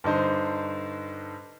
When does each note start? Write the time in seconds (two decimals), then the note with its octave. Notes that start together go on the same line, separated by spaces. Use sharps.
0.04 G2 D3 D#4 C5